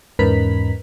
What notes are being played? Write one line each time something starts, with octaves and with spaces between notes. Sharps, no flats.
E2 G#2 C#4 A#4 B4 B6